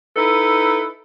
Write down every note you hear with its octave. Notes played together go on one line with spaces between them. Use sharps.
D#4 E4 A4 B4